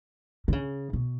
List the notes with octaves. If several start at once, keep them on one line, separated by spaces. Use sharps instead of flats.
D3
C#3
B2